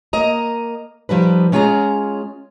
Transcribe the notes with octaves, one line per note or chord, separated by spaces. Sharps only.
A#3 D#5 A#5
F3 G3 D#4 B4
G#3 C#4 F4 G#4 A#5